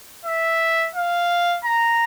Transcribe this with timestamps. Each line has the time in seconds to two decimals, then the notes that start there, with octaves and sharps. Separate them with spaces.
0.26 E5
0.95 F5
1.65 A#5